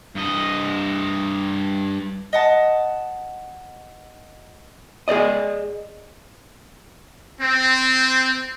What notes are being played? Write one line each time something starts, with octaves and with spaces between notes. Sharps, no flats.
G2 D#5
D#5 F#5 A5
G#4 C5 D5 D#5
C4